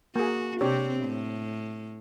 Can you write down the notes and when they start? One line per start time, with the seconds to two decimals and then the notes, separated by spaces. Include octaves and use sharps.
0.16 A#3 F#4 G#4
0.61 C3 C4 D4 G4 C#5
1.05 A2